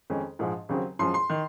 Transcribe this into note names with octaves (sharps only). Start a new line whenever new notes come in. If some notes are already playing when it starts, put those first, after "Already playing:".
F2 D#3 G#3 C#4
A#1 G#2 F3 G#3
D#2 C#3 F#3 C4
F#2 F3 G#3 C6
C6
D#3